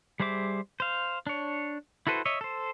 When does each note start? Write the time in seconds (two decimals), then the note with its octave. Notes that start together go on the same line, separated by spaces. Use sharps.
0.20 G3 G#4 C5 E5 D6
0.80 C5 F5
1.27 D4 C#5
2.07 E4 F#4 A4 B4 C5
2.26 C#5 D#5 E5
2.41 A4 C5